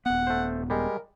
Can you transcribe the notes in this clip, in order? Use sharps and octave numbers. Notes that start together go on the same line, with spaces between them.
D#1 B3 F#5
A3 C5
G3 G#3 A#4